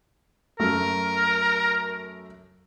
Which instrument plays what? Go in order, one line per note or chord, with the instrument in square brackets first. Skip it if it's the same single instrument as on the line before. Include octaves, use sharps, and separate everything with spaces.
[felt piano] F#2 A3 [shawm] A#4